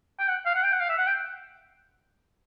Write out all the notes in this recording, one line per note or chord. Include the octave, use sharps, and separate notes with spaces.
G5
F#5
F5
F#5
G5
F#5
F5
E5
F#5
G5